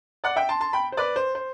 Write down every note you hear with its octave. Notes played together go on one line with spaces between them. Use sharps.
D5 F#5
E5 G5
A5 C6
A5 C6
G5 B5
C5
B4 D5
C5
C5